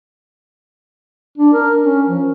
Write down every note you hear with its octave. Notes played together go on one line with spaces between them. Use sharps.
D4
A#4
C#4
F3